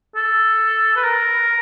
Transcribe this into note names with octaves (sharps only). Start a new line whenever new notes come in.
A4
B4
A#4